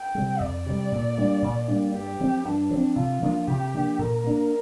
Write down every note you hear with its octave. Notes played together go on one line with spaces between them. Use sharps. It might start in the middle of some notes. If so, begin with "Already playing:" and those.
Already playing: G5
C3 G3
F2 D5
C3 G3
A#2
G3 A#3 D4
A#2
G3 A#3 D4
G2 G4
F3 C4
G2 D4
F3
C4
C3 F4
F3 A#3 D4
C3 G4
F3 A#3 D4
A#2 A#4
A#3 D4